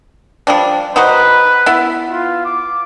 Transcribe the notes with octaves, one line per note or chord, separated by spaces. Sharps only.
F3 G3 D4
D#4 F#4 B4 C5
B3 E4
F4
D6